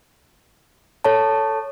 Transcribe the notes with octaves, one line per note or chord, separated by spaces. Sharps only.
A4 C#5 A5